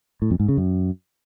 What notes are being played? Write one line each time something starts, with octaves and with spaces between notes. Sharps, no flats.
A2
F2
G#2
C#3
F#2